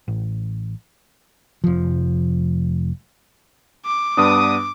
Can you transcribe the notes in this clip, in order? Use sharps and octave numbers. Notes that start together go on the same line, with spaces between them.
A1
F1 F3
D6
G2 B3 D4 D#6